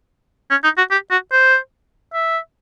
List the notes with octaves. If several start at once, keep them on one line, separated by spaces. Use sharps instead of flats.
C#4
D#4
F#4
G4
F#4
C5
E5